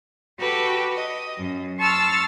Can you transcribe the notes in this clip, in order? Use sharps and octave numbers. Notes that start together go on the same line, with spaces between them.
F#4 G4 A4 B4 G5
D#5
F#2
A5 C6 C#6 E6 F6 A6